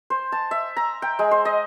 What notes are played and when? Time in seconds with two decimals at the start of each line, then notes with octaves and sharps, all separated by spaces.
0.10 C5
0.32 A5
0.51 E5
0.77 A#5
1.02 G5
1.19 G#3
1.31 C5
1.45 D#5